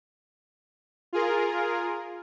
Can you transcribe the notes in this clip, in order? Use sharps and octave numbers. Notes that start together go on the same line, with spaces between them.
F4 G#4 A#4